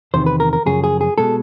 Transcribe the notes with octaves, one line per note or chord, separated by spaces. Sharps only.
E2 C3 D#3 C5
B4
A#4
A#4
F#2 C#3 F3 G#4
G#4
G#4
B2 G#3 A4